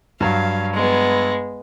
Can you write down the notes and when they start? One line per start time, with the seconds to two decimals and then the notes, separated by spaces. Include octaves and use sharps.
0.21 G2 F#3 F5
0.74 G#3 B3